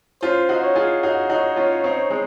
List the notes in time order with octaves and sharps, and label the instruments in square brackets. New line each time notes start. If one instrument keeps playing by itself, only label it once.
[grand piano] C#4 F4 [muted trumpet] C5
[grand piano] D#4 F#4
[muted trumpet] C#5
[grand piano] F4 G#4
D#4 F#4
D#4 F#4
C#4 F4
C4 D#4
G#3 C4